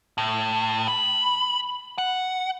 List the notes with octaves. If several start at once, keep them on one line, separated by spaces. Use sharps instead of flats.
A2
B5
F#5